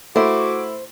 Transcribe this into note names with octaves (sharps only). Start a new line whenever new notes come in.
A3 E4 F#4 C5 D6